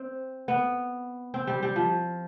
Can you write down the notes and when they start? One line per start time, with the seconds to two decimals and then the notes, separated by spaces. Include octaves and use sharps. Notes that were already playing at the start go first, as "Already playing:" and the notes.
Already playing: C4
0.48 B3
1.34 C4
1.47 G3
1.63 G3
1.76 F3